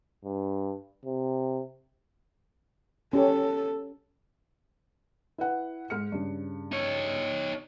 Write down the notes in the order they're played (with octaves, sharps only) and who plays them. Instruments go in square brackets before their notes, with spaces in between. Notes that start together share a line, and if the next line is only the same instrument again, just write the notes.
[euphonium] G2
C3
[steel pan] C#4 G4 C#5 [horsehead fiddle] A4
[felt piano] E4 B4 F#5
G#2 F6 C#7
G2 C#3
[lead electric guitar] D#4 C#5